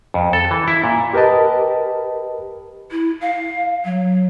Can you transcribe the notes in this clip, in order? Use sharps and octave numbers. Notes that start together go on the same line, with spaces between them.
F2
A4
E3
E4
A#2
G4 A#4 B4 D#5 A5
E4
F5
F#3